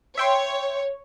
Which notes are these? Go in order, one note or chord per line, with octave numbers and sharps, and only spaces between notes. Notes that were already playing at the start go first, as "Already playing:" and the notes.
C#5 E5 G5 C6